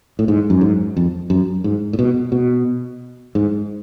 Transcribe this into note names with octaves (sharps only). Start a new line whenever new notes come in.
A2
G#2
F#2
G#2
F2
F#2
G#2
A2
B2
B2
G#2